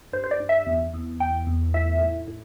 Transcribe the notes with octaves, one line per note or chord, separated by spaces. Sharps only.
G2 C5
C5
D5
G2
E5
E2
E2
E2 G5
E2
A2 E5
A2
A2